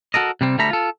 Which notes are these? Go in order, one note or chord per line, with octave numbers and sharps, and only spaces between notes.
F#4 A4 A#4 D#5
C3 G3 C4
D2 G3 A3 A4 A#5 B5
F4 A4